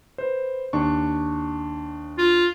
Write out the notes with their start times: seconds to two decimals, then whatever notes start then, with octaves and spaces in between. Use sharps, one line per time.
0.18 B4 C5
0.73 D#2 D4 C#6
2.18 F4